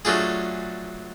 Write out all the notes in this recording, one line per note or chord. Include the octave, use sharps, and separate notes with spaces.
F#3 A3 D4 F4 G#4